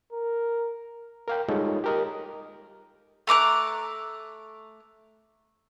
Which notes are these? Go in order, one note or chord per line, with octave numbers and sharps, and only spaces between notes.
A#4
A#4 F5 G5
G3 G#3 D#4 F4 A4 C#5
G4 A#4 D#5
A3 A#5 D6 F#6